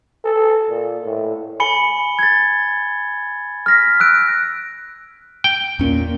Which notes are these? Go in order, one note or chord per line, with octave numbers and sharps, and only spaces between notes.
A4
A#2
A2
G#5 B5 C#7 G7
G#6 A6
F6 A#6 B6
E6 F#6 D7
G5
E2 A#2 C#4